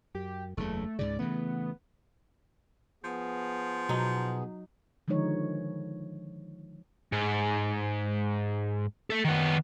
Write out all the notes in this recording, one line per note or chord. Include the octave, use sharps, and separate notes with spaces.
F#2 G4
F#1 E2 C#3 A3
C#2 G#2 C#3 D5
C#3 E3 A3 B3
F3 B3 G#4
B2 F#3 D#4
D3 D#3 F3 G#3 D#4 C#5
G#2
A4 E5
D#3 B3